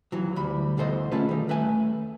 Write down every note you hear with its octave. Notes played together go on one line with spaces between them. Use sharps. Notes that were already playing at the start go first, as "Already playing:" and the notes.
D#2 E3 F#3
D2 G3 B5
D2 B2 E3 A4 C5 D#5
A3 C#4 F4 G#4 A4 B4
D#3 G3
D#2 A3 B4 E5 G#5